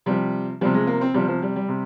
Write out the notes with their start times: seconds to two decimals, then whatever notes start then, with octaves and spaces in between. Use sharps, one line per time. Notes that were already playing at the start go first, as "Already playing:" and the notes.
0.06 C3 F3 G3
0.61 C3 F3 G3
0.74 G#3
0.87 A#3
1.01 C4
1.14 C3 F3 G3
1.28 F3
1.42 G3
1.56 G3
1.68 C3